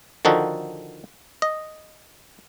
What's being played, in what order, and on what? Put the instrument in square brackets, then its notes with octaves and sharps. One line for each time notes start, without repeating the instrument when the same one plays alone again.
[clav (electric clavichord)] D3 D#3 F3 D#4 F#4 A4
D#5